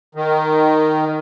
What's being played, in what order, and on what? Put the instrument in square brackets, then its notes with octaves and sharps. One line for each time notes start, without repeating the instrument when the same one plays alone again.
[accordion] D#3